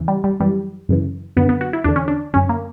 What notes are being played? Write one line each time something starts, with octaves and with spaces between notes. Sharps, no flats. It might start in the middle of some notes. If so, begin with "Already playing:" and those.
Already playing: E2 C#3 E3
G3
G3
F#2 E3 G3
F#2 C#3 E3
F#2 D3 B3
B3
F#4
E4
E2 D3 D4
C#4
D4
F#2 D3 C#4
A#3